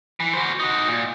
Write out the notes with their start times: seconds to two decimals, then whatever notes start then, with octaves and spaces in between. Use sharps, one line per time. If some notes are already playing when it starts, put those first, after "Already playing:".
0.20 E3
0.33 F#4 C5
0.60 D#4 F#4
0.88 A#2